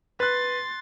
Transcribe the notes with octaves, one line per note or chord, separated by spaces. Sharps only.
B4 C6 F#6 A6